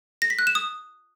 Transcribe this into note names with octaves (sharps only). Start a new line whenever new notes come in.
A#6
B6
F#6
E7
D#6